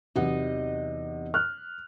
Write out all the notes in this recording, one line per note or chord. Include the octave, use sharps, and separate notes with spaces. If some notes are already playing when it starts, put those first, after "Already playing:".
E2 C3 F#3 D#4 D#5 F#5
F6 F#6